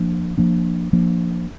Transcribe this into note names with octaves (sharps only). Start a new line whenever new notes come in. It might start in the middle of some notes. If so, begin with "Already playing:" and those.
Already playing: F3 A#3 D4
F3 A#3 D4
F3 A#3 D4